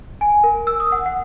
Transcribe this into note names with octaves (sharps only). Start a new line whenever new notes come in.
G#5
A#4
E6
D#6
F#5
F#5